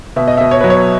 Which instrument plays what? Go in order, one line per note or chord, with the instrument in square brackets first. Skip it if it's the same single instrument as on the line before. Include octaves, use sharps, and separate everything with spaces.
[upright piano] B2 E5
D#5
E5
B2
C#5
F#3 B4
C#5